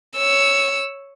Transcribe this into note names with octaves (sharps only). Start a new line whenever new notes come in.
C#5 E6